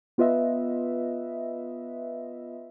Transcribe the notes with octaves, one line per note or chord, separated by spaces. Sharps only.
B3 F4 B4 D#5 E5